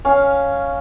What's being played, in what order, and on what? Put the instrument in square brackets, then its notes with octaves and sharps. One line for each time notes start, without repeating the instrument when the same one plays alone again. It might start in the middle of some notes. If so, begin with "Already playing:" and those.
[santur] C#4 F5